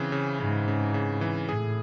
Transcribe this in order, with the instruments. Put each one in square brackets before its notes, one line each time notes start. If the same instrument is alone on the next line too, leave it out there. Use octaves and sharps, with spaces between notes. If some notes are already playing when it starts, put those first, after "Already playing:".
Already playing: [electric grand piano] C#3 E3 C4
C#3
[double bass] G#2 [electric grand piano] C#3
[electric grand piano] C#3
C#3
E3
[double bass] A2 [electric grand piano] G#4